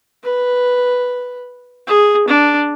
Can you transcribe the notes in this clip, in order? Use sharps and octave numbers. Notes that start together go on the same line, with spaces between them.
B4
G#4
D4